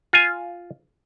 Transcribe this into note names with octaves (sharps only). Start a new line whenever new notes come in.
F4 G#5